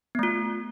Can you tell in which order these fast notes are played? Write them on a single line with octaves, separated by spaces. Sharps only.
B3 A3 F4